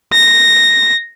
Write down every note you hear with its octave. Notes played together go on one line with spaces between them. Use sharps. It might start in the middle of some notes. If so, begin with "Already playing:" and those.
A#6